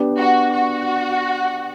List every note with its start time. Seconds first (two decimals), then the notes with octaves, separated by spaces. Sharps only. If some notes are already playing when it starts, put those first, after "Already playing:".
Already playing: B3 D4 G4 D5
0.18 F#4
0.53 F#4